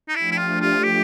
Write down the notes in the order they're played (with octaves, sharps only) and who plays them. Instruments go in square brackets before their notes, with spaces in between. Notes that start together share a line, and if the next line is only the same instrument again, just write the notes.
[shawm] D#4
[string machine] F3 A3 D4 G4 [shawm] E4
[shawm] E4
F4
F4
G4